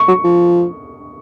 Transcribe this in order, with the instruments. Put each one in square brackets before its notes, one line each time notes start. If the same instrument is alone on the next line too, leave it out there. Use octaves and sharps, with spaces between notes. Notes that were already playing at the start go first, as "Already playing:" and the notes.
Already playing: [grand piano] C#6
[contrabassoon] F#3
F3